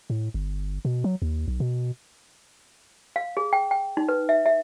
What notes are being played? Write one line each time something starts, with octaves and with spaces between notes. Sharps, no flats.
A2
G1
B2
F#3
D#2
B1
B2
F5
G#4
G5
G5
D#4
B4
E5
E5